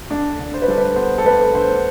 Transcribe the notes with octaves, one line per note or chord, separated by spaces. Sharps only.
D2 D4
D3
C5
B4
G3 A4
B4
B3 C5
A4
D2 B4
D3 C5